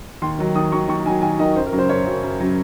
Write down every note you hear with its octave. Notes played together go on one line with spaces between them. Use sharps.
D#2 C6
D#3 F#3
D#2 D#6
D#3 F#3 C#6
D#2 C#6
D#3 F#3 G#5
D#2 G#5
D#3 F#3 D#5
F#2 C5
A#4
C#3 F#3
C5
F#2 C#5
C#3 F#3
F#2
C#3 F#3